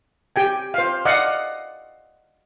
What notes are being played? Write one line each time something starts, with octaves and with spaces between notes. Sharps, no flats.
G4 G5 G#5
C5 F5
D5 D#5 F5 F#5